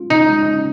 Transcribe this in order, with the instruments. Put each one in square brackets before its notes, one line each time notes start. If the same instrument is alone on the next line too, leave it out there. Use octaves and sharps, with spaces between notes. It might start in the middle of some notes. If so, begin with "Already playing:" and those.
Already playing: [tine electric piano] G#3 C#4 F4
[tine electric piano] C#3 [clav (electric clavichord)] D#4
[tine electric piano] G#3
C#4